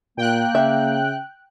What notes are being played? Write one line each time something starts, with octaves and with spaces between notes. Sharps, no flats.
A#2 A#3 G5 F#6
C#3 E5